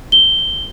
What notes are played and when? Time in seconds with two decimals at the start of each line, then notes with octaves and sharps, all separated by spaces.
0.12 G7